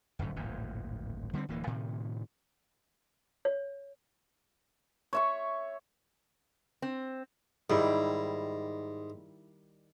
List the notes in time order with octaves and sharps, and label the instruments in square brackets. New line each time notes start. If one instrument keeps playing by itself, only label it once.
[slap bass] D1 G1 F#2 A2
D1 G#1 F2 A#2
D3 G3 G#3 C4
D1 E3 A#3
A2 C3 D#3
[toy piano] C#5
[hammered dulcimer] C#5 E5 C#6
[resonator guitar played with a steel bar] C4
[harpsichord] G#2 [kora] D#3 G3 E4